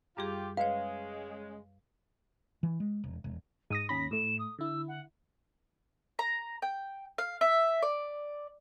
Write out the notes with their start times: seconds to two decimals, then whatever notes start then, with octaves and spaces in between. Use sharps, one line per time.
0.17 F#2 G3 F4 G4 G#4
0.57 C#3 G#3 B4 C#5 F5
2.63 E3
2.80 G#3
3.04 E1
3.24 E1
3.70 G#2 D#6 A#6 D#7
3.89 D#2 C#4 B5 A#6 B6
4.11 A2 A3 E7
4.39 D#6
4.59 D3 E4 E6
4.88 F#5
6.19 A#5
6.62 G5
7.18 F5
7.41 E5
7.82 D5